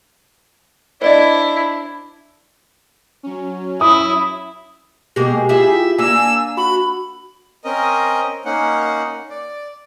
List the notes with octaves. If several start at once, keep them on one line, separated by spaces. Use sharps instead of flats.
D4 E4 C5 D5 D#5
F#3 C#4
E4 D#6
B2 G#3 A#3 G4
E4 F4 G#4 E5
A#3 D4 G#5 E6
F#4 B5
C4 C#4 A#4 D#5
A#3 C#4 D#4 F#5
D5